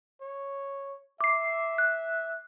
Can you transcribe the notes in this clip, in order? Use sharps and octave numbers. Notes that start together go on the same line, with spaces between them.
C#5
E5 D6 C7
F#6